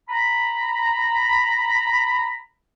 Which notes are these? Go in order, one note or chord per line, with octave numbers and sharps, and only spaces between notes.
A#5 B5